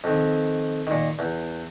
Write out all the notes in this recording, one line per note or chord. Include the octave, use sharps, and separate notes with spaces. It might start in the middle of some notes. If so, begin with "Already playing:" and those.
F2 D#3
A#2 D#3
E2